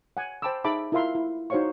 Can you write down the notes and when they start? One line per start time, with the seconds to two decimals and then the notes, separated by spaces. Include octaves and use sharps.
0.17 F#5 G#5
0.42 C5 G5 A5 B5 D6 E6
0.64 D#4 G#4 E5 A5 B5 D6
0.92 E4 F4 A#4 E5 F5 C6
1.15 E4
1.50 D#4 F#4 C5 C#5 F5 C#6